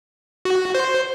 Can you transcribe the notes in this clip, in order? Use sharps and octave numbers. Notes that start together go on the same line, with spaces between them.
F#4
C5